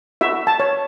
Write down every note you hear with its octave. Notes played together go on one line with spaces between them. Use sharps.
F#4 E5
A5
C#5